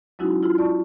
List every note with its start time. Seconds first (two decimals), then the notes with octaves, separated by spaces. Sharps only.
0.19 F#3 G#3 C#4 D#4 E4 F#4
0.43 E4 F4
0.58 D5 A5 C#6